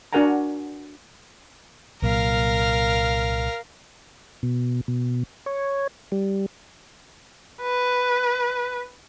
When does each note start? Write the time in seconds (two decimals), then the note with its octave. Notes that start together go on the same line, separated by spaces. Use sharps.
0.13 D4 F#4 A#4 F#5 G#5 A#5
2.02 C2 A#2 F#3 A#4 F5
4.43 B2
4.88 B2
5.46 C#5
6.12 G3
7.62 B4